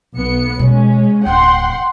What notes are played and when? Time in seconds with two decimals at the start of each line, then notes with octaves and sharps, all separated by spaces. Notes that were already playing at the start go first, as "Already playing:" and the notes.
0.15 B1 B3 C#7
0.59 B2 G#3 C#4
1.26 D1 D2 F#5 G5 C6